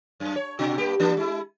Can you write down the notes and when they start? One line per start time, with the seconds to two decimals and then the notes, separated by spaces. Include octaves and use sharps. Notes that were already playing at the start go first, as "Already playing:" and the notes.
0.20 F#2
0.36 C#5
0.59 B2 D4 F#4
0.78 G2 A#3 G4
1.00 E3 A#3 D4
1.17 G#3 E4